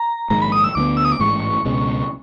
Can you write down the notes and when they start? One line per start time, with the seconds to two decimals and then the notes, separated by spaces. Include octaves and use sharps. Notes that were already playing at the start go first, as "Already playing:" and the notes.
Already playing: A#5
0.30 A#1 G#2 D#3 G#3 A#5
0.42 B5
0.52 D#6
0.64 E6
0.75 D2 D3 F#3 B3 D6
0.97 E6
1.05 D#6
1.12 D6
1.20 A1 G#2 E3 G#3 C#6
1.65 C#2 B2 G#3 C#4